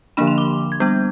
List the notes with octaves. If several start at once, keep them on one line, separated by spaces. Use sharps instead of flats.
D3 F3 A#3 D4 B5
C6
D6
G#6
G3 B3 D4 G6